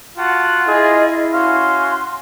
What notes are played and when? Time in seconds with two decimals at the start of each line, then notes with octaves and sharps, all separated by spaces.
0.17 F4 F#4 F#5 A5
0.67 E4 G#4 D#5
1.34 C#4 F#4 F5 G#5 C6